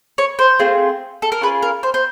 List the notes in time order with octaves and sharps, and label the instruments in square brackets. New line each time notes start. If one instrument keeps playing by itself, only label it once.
[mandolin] C#5
C5
A3 C4 F4 G#4
A4
A#4
C#4 F4 G#4 B4
A#4
C5
C5